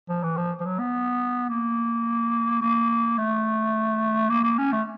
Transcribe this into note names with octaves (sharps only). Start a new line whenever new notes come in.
F3
E3
F3
F3
F#3
B3
A#3
A#3
A3
A#3
A#3
C#4
A3